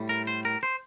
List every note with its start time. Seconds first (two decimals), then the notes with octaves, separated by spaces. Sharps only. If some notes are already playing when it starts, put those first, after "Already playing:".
Already playing: A2 G3
0.09 A#4
0.27 C5
0.45 A#4
0.63 C5